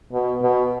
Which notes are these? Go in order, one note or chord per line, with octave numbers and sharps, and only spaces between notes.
B2
B2